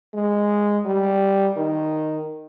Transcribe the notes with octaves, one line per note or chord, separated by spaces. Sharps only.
G#3
G3
D#3